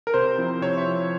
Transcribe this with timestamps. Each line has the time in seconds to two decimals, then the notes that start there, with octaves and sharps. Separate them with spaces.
0.07 A#4
0.14 C3 C5
0.38 F3 C4 E4
0.61 C3 C#5
0.78 E5
0.86 F3 C4 E4